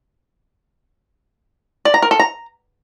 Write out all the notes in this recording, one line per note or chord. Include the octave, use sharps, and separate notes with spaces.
D5
A#5
A#4
A4
A#5